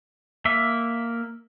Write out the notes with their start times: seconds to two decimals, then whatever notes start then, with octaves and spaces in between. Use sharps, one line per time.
0.45 A#3 E5